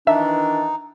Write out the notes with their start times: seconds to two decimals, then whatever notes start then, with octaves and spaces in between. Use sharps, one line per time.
0.07 D#3 E3 D4 D#4 E5